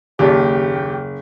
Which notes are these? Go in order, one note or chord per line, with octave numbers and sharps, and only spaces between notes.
F#1 D#2 G4 D5
G5